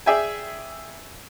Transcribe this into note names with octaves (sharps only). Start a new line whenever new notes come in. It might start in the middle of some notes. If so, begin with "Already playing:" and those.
G#4 D5 E5 G5 G#5